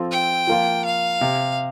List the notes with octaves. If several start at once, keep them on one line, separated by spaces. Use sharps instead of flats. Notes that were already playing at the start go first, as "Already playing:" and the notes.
Already playing: F3 C4 F4 A4
G5
F3 A#3 F4
F5
C3